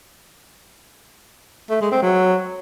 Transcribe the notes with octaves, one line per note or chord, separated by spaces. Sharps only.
A3
G#3
C4
F#3